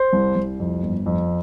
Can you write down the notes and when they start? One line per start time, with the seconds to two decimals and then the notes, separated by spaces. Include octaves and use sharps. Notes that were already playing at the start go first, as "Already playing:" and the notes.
Already playing: C5
0.13 C2
0.36 C2
0.60 F2
0.83 G1
1.06 F2